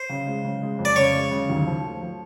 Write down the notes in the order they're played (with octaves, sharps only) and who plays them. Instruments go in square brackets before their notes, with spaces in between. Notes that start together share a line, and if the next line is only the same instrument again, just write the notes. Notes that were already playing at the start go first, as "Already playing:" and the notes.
Already playing: [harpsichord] C5
[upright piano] C#3
G#3
C#3
G#3
F2
[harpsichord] D5
[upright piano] C#3 [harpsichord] C#5
[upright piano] G#3
C#3
D#2
F3
A3
F3